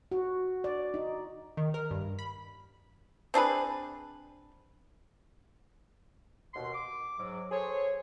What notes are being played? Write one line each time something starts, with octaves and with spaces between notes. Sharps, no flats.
F#4
D5
D#4
D#3
A#4
G2
B5
C4 D4 G#4 B4
D#2 B2 C6
D6
G#2 F#3
G#4 A4 C5 C#5